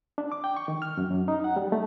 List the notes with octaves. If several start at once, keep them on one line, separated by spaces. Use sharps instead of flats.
D4
D6
G5
C#6
D#3
F6
F#2
F#2
D#4
F#5
G3
A3